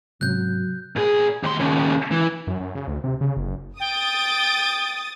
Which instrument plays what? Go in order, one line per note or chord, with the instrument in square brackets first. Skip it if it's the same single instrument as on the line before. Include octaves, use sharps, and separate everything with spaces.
[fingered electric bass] G#2 C3 C#4 [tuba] F#3 [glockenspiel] F#6 G6
[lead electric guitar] A#2 G#4
D#2 C6
D#2 C#3
E3
[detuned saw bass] F#2
F#2
C#3
D2
C3
C#3
F#1
[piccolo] G5 [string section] D#6 A6